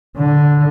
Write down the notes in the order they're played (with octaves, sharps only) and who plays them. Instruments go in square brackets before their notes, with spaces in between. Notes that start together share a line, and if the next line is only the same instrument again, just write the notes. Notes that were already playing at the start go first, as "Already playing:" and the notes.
[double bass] D3